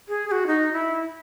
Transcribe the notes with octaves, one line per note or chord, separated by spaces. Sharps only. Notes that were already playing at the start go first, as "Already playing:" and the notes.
G#4
G#4
F#4
D#4
E4